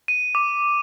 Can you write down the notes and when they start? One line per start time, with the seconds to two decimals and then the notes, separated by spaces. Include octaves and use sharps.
0.08 D#7
0.35 D6